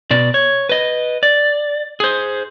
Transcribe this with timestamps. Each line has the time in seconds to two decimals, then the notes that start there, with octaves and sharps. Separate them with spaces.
0.11 B2 D5
0.34 C#5
0.69 B4 D#5
1.23 D5
2.00 G#4 C5